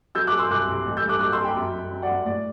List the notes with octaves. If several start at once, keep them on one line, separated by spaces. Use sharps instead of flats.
F#3 E6 G6
D6 F#6
F#3
C6 E6
C2 D6 F#6
C2
A1
E6 G6
G2
D6 F#6
F#3 D6 F#6
C6 E6
F#3
G5 B5
F#2
F#2
F#2
D5 F#5
F#2
A2 D5